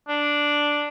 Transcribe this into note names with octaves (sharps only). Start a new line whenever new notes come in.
D4